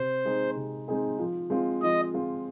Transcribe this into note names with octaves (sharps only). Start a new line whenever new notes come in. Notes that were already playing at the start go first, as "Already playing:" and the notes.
Already playing: C3 C5
G#3 C4 D#4 G#4
C3
G#3 C4 D#4 G#4
F3
G#3 C4 F4
F3 D#5
G#3 C4 F4